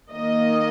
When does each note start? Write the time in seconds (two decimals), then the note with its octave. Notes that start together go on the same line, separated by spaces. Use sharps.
0.10 D#3 A#3 D#5